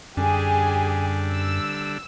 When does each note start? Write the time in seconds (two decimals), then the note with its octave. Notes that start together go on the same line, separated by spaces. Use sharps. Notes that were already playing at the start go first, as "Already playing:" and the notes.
0.17 F#2 D3 G3 D4 G4 G#4 G#5
1.31 E6